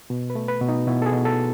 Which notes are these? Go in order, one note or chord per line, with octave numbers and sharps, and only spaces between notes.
B2
B4
A3
B4
B2
D#4
B2 E4
A4
G#4
B2
A4